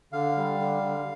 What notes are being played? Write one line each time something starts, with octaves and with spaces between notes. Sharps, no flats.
D3 F5
G3
D3
D3